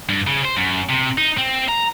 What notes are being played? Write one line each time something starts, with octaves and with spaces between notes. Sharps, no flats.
G2
C#3
C5
F#2
C3
D#4
C4
A#5